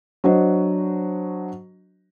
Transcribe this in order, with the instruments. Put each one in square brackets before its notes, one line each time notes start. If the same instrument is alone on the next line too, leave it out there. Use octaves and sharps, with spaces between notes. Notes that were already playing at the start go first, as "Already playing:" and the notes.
[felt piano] F#3 D4 F#4 C5 D#5